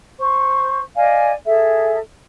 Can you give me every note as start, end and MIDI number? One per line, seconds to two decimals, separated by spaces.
0.19 0.79 72
0.19 0.79 85
0.95 1.32 74
0.95 1.32 75
0.95 1.32 77
0.95 1.32 80
1.45 1.97 68
1.45 1.97 69
1.45 1.97 76